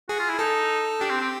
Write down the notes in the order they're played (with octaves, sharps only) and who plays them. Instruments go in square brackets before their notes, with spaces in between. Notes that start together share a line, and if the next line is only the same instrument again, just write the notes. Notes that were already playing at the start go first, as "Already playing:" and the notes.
[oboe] F#4 [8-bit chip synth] G#4
[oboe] F4
E4
[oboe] D#4 [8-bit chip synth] A4
[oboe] D4 [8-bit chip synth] G4
[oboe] C4
C4